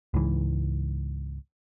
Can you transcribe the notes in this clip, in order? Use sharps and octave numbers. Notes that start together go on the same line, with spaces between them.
C#2 G#2 E3